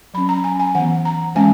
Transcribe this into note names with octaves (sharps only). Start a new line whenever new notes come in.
F#3 C#4 B5
A#5
G#5
G#5
E3 B3 F#5
A#5
E3 G#3 C#4 G#5